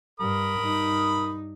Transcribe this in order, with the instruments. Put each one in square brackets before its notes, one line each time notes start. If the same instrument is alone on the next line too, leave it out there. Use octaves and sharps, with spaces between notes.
[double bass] G2 [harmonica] A#4 B5 D#6
[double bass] G2 D#4